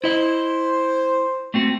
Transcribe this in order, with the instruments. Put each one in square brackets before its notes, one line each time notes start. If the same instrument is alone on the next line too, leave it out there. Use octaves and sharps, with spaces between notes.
[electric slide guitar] E4 D#5 [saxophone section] C5
[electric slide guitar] A3 C4 F#4